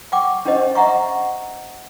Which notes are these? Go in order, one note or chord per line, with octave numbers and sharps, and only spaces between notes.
F#5 G5 C#6 D6
C#4 D4 G4 C5 D#5
D#5 E5 F#5 A#5 C#6